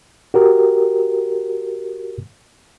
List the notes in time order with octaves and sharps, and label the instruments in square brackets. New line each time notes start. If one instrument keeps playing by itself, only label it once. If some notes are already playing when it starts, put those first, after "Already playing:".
[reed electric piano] F#4 G4 A#4